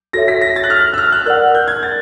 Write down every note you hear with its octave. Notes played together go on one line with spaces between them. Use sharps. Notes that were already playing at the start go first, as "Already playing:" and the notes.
F#4 A4 C#5 E5 A#6
B6
A#6
A6
F#6
F6
E6
F6
F#6
A#4 D5 F#5 F#6
G6
G#6
A6